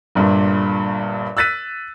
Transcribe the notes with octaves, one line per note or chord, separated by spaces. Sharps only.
G1 G2 A#2
E6 F#6 A6 B6 D#7